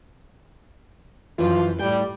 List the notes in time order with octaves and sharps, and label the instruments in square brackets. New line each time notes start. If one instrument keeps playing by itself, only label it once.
[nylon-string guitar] F#2 E3 F3 [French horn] F4
[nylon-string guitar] A2 G5 [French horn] G3